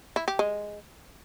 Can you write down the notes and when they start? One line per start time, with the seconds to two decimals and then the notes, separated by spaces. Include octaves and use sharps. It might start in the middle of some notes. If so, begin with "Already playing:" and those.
0.16 E4
0.28 G4
0.39 G#3